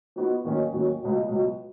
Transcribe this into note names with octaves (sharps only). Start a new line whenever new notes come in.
F3 B3 D#4 F#4 B4
D#2 D#3 F#3 C#4
D#2 D#3 F#3 C#4
C#2 B2 F#3
C#2 B2 F#3